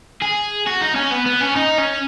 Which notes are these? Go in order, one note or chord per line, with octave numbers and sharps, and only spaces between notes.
G#4
F#4
D#4
C#4
B3
B3
C#4
D#4
C#4